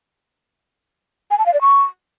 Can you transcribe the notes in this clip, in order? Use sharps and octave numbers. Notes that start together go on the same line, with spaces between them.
G#5
A5
F5
D5
C#6